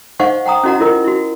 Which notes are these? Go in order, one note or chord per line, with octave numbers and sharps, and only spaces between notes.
D#4 C5 D#5 F5 F#5 C#6
F#5 G5 A#5 D#6
C#4 E4 F#4 D#5 F#5 A#5
E4 F4 A#4 D#5
E4 F#4